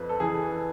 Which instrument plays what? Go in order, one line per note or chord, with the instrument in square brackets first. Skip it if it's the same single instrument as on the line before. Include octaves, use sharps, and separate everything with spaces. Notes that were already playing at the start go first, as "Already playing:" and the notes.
Already playing: [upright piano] F2 [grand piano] B4
[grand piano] A4
[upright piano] E3 [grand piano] G#4